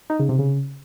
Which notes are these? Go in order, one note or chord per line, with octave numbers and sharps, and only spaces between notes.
D#4
C#3
C3
C#3